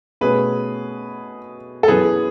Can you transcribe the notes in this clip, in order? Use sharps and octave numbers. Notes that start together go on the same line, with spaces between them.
B2 A3 C#4 G#4 B4
A4
F#2 E3 B3 G#4 B4